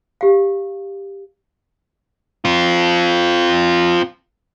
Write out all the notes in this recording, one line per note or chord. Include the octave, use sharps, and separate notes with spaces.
G4 F5
C4 F4